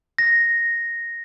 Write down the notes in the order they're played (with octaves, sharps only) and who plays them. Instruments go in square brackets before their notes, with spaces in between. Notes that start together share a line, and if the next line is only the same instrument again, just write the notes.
[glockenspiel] A#6